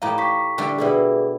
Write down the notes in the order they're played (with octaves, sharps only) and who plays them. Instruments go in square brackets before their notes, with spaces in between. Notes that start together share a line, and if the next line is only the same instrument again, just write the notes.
[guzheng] A2 G4 D#5 [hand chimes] F5 A#5
[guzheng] G4 [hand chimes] C#6 B6
[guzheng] D3 G3 A3
[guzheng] B2 E4 G4 [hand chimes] G#4 D5 E5